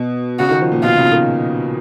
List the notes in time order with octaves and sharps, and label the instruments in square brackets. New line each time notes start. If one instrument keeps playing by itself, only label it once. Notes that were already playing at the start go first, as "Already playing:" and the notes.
Already playing: [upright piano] B2
[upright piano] C#3 [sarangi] F#4
[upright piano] D#3
F3
A#2
[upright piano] B2 [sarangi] F4
[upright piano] C#3
D#3